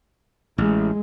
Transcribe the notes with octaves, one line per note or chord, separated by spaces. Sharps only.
A1 G#3